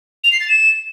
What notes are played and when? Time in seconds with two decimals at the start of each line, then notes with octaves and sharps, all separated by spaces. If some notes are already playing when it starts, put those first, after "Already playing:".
0.24 F7
0.32 C7
0.40 A6
0.49 E7